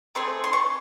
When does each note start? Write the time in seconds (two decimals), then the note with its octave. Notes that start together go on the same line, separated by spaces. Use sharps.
0.15 A3 C4 G#4 C6
0.44 C6
0.53 C#6